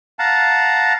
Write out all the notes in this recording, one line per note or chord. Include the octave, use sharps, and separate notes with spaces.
F5 F#5 A5 A#5